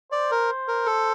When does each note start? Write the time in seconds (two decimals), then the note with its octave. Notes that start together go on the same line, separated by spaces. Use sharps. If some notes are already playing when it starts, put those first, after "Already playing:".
0.12 C5 D5
0.31 A#4
0.68 A#4
0.86 A4